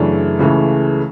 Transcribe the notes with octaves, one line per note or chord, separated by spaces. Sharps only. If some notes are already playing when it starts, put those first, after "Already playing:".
Already playing: F#2 C#3 E3 A3 D4
C#2 C#3 E3 A3